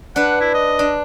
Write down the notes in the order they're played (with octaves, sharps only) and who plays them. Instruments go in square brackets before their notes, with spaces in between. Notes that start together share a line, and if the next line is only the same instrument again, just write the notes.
[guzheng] D4 B4 [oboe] F#5
[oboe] E4
D#5
[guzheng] D4